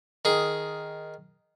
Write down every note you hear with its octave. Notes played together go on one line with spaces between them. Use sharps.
D#3 G#4